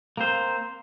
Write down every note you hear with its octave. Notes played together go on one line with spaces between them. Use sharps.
A#3 C4 C5